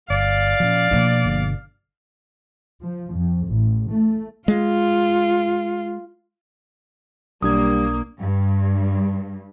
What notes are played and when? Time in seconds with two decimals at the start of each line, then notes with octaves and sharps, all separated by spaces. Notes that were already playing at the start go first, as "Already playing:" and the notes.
0.10 G1 D5 F5
0.60 A#2 F3 C4 C#4
0.91 B2 F3 A#3 D4
1.25 G1 B2 D3
2.83 F3
3.15 F2
3.48 A1
3.91 A3
4.48 G#3 F4
7.42 B1 G3 A#3 D4 D#6 G#6
8.19 G2